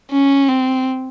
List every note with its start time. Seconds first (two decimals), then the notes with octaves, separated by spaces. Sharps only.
0.11 C#4
0.49 C4